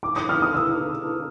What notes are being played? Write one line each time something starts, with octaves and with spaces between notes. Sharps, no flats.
D6
D#6
F6
D#6
E6